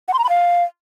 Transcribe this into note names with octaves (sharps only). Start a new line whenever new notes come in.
F#5
C6
A#5
B5
F5